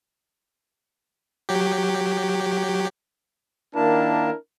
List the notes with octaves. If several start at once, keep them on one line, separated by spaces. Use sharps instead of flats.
F#3 G4
D#3 A#3 D4 E4 A#4 A5